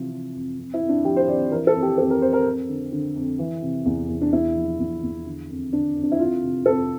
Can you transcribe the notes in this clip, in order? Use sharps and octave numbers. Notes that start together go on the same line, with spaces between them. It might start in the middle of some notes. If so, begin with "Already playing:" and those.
Already playing: C3 E3 F3
C3
F2
F2
E4
F2
D4
F3 G4
C5
F2 D5
E3 A#4
A4
F2
G4
F2 A4
A#4
F2 C5
A#4
F2
D3
D3
F2
E3
C3
E2
E2
D4
E2 E4
F3
E2
E2
D3
F2
D3 D4
F2
D4
E4
F2 F4
C3
F2 A4